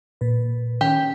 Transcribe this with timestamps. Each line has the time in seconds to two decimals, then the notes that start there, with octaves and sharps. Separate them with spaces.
0.21 A#2 B4
0.81 D#3 C#4 G4